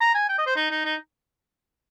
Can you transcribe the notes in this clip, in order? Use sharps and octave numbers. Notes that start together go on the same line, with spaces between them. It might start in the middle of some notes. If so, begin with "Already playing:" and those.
A#5
G#5
G5
D#5
C5
D#4
D#4
D#4